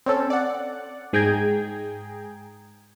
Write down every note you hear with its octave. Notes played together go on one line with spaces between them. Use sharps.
C4 C#4 A4
D5 F#5
G#2 G#4 G5 A#5 G#6